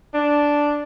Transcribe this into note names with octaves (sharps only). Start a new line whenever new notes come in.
D4